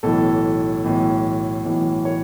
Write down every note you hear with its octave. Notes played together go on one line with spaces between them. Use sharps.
B1 A2 E3 A4
B1 A2 E3
B1 A2 E3
C#5